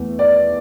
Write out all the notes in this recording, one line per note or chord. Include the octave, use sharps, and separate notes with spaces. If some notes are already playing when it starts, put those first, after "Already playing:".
Already playing: E2 E3 A3
D5